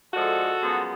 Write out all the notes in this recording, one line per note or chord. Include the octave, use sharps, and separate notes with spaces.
D3 F3 G#3 F#4 A4
F#2 F3 G#3 B3